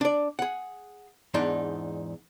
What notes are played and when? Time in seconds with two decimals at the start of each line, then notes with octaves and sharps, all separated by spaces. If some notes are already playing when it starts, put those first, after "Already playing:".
0.01 D4 D5
0.39 G#4 F#5
1.34 E2 G#2 D4 D#4 D5